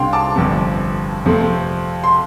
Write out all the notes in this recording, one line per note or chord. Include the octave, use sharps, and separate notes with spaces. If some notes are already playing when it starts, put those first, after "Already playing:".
Already playing: C2 C3 D4 F5 G5 C6
A5 D6
G1 F2 C3
F2 C3 A3 C4
C6